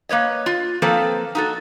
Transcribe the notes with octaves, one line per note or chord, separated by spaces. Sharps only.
A#3 B4 C#5 D#5
F4
F3 A#3 C4 A4 B4
D#4 F#4 A4